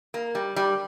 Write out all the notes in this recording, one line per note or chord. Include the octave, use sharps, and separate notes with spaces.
A#3
G3
G3